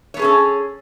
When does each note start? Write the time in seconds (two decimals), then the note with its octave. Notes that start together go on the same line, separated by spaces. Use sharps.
0.14 C#5
0.17 B3
0.19 G#4
0.22 C#4
0.24 A4